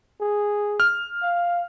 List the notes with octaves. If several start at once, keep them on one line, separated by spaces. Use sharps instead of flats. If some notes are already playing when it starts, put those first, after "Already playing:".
G#4
F6
F5